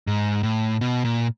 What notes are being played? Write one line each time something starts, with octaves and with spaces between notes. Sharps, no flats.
G#2
A2
B2
A#2